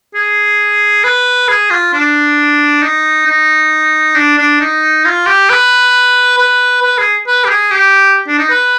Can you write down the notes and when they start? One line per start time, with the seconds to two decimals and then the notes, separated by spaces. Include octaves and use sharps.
0.15 G#4
1.04 B4
1.48 G#4
1.70 F4
1.93 D4
2.82 D#4
3.26 D#4
4.16 D4
4.37 D4
4.60 D#4
5.05 F4
5.26 G4
5.49 B4
6.38 B4
6.82 B4
6.98 G#4
7.27 B4
7.45 G4
7.50 G#4
7.71 G4
8.27 D4
8.38 D#4
8.50 B4